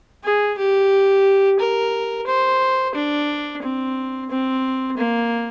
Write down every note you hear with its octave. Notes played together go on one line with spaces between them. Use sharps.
G#4
G4
A#4
C5
D4
C4
C4
A#3